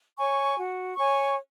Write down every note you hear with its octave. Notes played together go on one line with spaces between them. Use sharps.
C#5 G#5 C#6
F#4
C#5 G#5 C#6